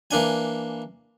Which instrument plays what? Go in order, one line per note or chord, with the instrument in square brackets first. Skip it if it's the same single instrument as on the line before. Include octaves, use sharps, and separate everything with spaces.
[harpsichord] E3 A#3 D4 G#5